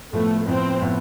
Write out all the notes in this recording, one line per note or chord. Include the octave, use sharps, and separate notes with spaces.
A2 F3 A3 B3
A2 F3 B3 C4
A2 F3 B3